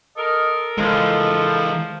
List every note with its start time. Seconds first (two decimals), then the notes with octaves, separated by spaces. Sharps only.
0.17 A4 A#4 D#5
0.78 E3 F3 G#3 A4 A#4